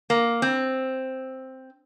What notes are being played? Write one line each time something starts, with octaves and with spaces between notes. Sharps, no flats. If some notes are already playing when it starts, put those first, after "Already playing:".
A#3
C4